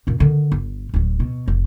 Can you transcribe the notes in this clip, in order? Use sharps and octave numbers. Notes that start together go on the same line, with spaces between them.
F#2 A#2
D3 D#3
G1
D1 F#3
B2
F1